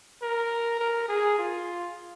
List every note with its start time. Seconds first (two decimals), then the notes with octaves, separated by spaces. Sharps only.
0.22 A#4
0.79 A#4
1.08 G#4
1.38 F4